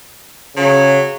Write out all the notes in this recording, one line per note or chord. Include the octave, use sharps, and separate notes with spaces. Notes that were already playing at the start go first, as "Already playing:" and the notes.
C#3 F#3